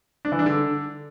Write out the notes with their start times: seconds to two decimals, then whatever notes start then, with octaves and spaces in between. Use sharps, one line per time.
0.25 D4
0.32 E3
0.39 D4
0.46 D3